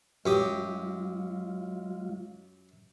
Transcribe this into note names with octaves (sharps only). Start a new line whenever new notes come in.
F#2 F#3 G#3 F4 G4 D#6